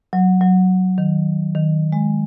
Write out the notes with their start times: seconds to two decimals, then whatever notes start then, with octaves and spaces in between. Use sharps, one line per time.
0.13 F#3
0.41 F#3
0.98 D#3
1.55 D#3
1.92 G#3